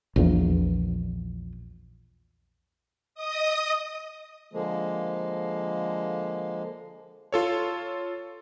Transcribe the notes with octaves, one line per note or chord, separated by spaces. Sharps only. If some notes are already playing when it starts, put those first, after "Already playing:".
A#1 E2 A#2
D#5 D#6
D3 F3 G#3 A#3
F4 A4 C#5